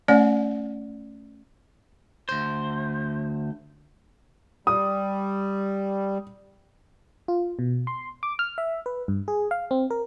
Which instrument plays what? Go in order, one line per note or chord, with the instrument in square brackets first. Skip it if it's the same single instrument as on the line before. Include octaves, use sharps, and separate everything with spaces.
[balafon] A3 C#4 C#5 D5 F#5
[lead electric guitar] D2 C5
[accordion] G3 [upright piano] D#6
[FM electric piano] F4
B2
C6
D6
F6
E5
B4
G2
G#4
F5
C4
A#4